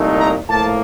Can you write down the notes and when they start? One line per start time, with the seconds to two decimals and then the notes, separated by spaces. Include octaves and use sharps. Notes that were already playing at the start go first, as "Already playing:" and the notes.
Already playing: C2 A#2 A3 D#4
0.18 A#5
0.47 A2 F3 A#3 A5